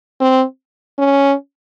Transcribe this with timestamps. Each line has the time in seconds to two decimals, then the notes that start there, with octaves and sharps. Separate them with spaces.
0.20 C4
0.99 C#4